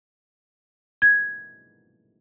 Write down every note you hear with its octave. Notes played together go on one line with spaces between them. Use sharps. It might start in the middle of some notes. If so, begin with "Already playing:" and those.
G#6